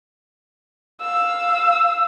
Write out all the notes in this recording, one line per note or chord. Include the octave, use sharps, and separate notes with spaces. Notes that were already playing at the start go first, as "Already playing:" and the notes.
F5 E6